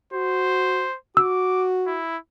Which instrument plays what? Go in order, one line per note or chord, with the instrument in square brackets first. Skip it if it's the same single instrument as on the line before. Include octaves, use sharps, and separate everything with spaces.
[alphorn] F#4 [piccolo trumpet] C5
[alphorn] F#4 [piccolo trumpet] D6 [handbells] E6
[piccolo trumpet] E4